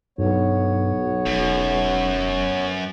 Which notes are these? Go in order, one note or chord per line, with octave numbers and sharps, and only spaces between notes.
B1 G2 B3 C#5
E1 F#2